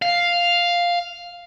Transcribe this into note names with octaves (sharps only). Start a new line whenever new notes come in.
F5